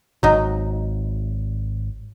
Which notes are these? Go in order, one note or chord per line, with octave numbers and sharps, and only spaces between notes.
G#1 F#3 D#4